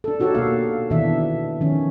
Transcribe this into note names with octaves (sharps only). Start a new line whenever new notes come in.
D4 A4
D#4 F#4 G4 A4 C#5
B2 A#3 F5
B2 D#3 E3 D4 E5
D#3 F3 C#4